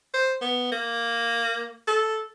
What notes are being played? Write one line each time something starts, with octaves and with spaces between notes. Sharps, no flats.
C5
B3
A#3
A4